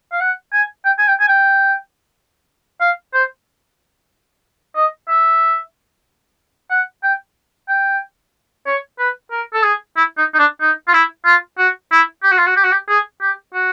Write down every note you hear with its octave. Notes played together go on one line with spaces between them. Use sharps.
F5
F#5
G#5
G5
G#5
G5
G#5
G5
F5
C5
D#5
E5
F#5
G5
G5
C#5
B4
A#4
A4
G#4
E4
D#4
D#4
D4
D#4
F4
E4
F4
F#4
E4
G4
F#4
F4
F#4
G4
F#4
G4
G#4
G4
F#4